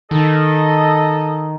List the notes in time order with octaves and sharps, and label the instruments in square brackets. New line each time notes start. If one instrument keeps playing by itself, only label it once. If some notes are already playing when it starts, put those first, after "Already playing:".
[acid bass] D#3 [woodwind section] A4 D#5